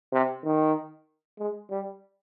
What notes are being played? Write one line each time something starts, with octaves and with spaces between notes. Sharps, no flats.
C3
D#3
G#3
G3